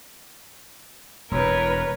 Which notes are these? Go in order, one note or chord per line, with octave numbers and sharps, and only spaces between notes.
E1 E2 A#4 B4 C#5